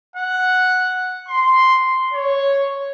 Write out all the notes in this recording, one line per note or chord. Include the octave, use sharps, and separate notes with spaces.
F#5
C6
C#5